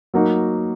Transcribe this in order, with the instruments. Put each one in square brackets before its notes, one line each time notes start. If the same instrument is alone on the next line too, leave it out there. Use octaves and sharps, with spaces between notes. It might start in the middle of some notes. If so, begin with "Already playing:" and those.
[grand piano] F#3 A#3 D#4 F#4